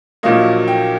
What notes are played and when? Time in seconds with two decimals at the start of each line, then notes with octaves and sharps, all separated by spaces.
0.23 A#1 A#2 F#3 A#3 D#5
0.68 G5